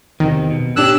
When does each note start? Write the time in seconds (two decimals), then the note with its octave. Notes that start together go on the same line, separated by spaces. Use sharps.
0.20 E2 C3 D#3
0.51 B2
0.76 C#4 D4 G4 E6 F#6